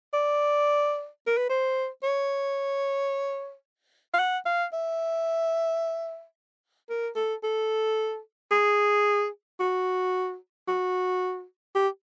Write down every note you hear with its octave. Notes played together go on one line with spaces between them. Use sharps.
D5
A#4
B4
C5
C#5
F5
F#5
F5
E5
A#4
A4
A4
G#4
F#4
F#4
G4